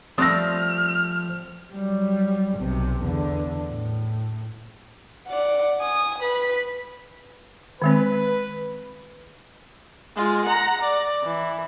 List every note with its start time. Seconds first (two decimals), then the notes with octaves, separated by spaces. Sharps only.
0.18 F3 G3 A3 C4 D#6 F6 F#6 A#6
1.73 F#3 G3
2.57 B1 C3
3.02 E2 D3
3.68 A2
5.28 D5 F#5
5.80 G#5 D#6
6.18 B4 B5
7.82 D#3 G#3 C4 B4
10.16 G#3 F4
10.46 F#5 A#5
10.82 D5
11.23 E3